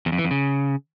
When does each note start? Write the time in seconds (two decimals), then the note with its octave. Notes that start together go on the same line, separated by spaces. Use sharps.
0.06 E2
0.12 F2
0.18 E3
0.25 F2
0.31 C#3